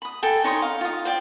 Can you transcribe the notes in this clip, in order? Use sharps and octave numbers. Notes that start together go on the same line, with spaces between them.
B5 D#6
A4 G5 G#5
D#4 C#5 C6 D#6
F5
F4 D#6
C5 D5 G5